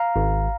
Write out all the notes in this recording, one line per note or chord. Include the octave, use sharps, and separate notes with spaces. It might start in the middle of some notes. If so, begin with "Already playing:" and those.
Already playing: F5 A#5
G#1